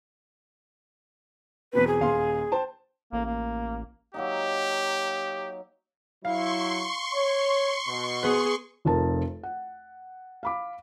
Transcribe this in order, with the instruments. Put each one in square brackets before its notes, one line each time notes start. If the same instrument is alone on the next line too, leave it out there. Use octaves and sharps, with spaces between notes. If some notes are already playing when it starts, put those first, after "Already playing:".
[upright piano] E2 B2 C4 [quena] B4
[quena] G#4
[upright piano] D#1 F5 C6
C5 G5 A5
[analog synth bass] A1 [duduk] A#3
[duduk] A#3
[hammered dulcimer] F#3 A#3 D#4 [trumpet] G4
[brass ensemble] F#3 E4 [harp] F5 [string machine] C6 C#6
[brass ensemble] C#5
B2
[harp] B3 B4 [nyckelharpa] G#4
[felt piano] F1 F2 A#4 A5
F#5
F5 B5 D6